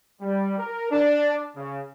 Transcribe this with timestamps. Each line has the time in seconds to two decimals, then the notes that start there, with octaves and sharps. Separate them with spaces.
0.22 G3
0.58 A#4
0.91 D4
1.56 C#3